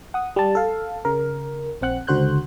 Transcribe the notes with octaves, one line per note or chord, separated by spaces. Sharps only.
F#5 D#6
G3 A5
A4 F5 A5
C#3 A#4
A#1 C4 F#5 F#6
C#2 D3 F#4 C5 F#6 G6